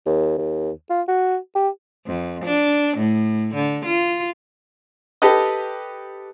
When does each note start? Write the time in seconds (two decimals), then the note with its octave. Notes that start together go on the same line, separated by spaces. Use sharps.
0.06 D#2
0.38 D#2
0.90 F4
1.08 F#4
1.55 G4
2.07 F2
2.45 D4
2.97 A2
3.55 D3
3.86 F4
5.22 G4 A4 B4 D#5